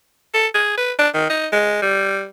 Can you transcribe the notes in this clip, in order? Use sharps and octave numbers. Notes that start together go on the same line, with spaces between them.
A4
G#4
B4
D4
D#3
D#4
G#3
G3